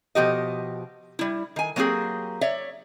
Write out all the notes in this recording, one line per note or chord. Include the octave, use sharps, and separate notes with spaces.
B2 F3 G4 D#5
G3 E4
D#3 G#5
F#3 A#3 C4 G4 G#4
C#5 D5 E5